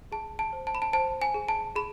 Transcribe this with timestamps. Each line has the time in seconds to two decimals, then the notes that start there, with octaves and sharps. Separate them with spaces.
0.12 G#4 A5
0.39 A5
0.53 C5
0.67 A5
0.75 B5
0.82 A5
0.93 C5 A5
1.22 G#5
1.34 G#4
1.48 A5
1.76 G#4 B5